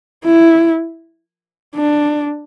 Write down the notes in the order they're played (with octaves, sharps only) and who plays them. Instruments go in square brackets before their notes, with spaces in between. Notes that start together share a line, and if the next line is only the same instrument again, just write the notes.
[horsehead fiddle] E4
D4